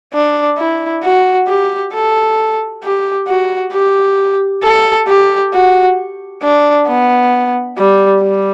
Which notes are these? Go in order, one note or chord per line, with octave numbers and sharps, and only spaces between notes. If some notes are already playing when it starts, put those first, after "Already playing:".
D4
E4
F#4
G4
A4
G4
F#4
G4
A4
G4
F#4
D4
B3
G3
G3